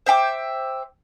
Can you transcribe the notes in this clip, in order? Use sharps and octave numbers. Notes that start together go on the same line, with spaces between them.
C5 E5 G5 D6